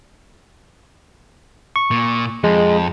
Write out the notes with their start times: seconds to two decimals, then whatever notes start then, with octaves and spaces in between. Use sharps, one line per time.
1.76 C#6
1.91 A#2
2.44 F2 G#3